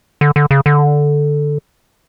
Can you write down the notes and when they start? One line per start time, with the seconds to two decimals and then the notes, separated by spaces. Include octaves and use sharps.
0.21 D3
0.36 D3
0.51 C#3
0.66 D3